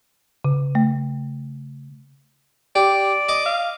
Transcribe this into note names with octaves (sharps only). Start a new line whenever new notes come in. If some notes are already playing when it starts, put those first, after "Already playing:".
C#3
A3
G4 D5
D#5 D6
F5